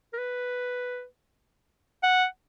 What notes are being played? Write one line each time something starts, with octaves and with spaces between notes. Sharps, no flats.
A#4
B4
F#5